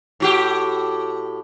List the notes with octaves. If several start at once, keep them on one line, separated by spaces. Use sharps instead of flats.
A2 F#4 G4